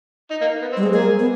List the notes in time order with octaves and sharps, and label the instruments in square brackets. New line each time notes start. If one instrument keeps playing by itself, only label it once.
[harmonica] D#4
A#3
B3
C4
[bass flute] G3
G#3
[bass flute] A#3 [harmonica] G#4
[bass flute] B3